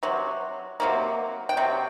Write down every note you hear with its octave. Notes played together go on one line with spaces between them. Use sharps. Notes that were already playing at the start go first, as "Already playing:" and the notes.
C3 F#3
C3 F#3 A#3
G5
C3 F#3